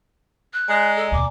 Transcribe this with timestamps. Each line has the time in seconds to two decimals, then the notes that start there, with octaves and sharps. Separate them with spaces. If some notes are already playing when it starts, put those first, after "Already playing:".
0.53 F#6
0.68 G#3 D5 G#5 A#5
0.96 A4
1.12 D#2 B2 D6